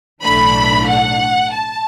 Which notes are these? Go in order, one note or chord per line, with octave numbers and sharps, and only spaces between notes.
B1 A2 E3 A3 D4 B5
F#5
A5